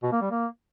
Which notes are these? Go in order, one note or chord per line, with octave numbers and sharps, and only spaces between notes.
B2
A#3
G3
A#3